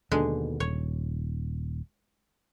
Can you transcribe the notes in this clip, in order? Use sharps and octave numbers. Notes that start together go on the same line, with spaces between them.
D#2 B2 D3 G#3
D#1 C#5